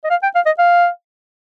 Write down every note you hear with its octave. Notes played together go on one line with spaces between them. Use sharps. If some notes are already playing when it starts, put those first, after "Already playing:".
D#5
F5
G5
F5
D#5
F5